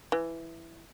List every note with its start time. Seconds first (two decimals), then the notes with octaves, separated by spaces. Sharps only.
0.12 E3